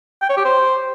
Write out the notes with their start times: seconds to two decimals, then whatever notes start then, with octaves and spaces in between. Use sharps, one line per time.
0.21 G5
0.29 C#5
0.37 G4
0.45 C5